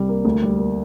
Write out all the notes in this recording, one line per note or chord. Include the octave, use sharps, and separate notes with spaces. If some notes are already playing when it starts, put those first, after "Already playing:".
Already playing: C2 G3
A#3
D2
G3
A#3